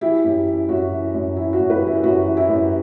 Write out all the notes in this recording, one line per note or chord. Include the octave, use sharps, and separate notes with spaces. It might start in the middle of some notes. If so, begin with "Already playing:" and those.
E3 E4 G4
F#2
E3
F#2 F#4
E3
F#2
E3 E4
F#4
F#2
G4 B4
E3
E4
F#2 F#4
E3
E4 G4
F#2